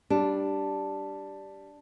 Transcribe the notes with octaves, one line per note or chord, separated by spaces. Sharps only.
G3 D4